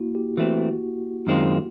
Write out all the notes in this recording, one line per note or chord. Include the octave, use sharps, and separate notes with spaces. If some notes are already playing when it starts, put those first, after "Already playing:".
Already playing: A#3 E4 F#4
G4
E3 A3 C4 F#4
F#2 D#3 G#3 C4 F4